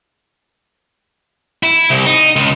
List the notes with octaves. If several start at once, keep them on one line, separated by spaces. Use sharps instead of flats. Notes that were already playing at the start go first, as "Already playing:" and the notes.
E4
C2
D#4
C#2